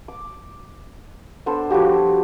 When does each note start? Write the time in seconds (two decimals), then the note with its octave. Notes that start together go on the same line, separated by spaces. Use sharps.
0.08 D6
1.46 B3 D4 A4 C5
1.70 F3 G3 F#4 G4